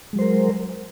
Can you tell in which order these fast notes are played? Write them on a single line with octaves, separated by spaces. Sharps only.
G#3 F#3 C5 A#4